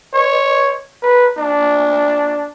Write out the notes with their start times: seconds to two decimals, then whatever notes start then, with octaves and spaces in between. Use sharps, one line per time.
0.14 C#5
1.02 B4
1.37 D4